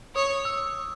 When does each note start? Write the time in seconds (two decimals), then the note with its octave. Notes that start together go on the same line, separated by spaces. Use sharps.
0.15 C#5 D#6
0.45 E6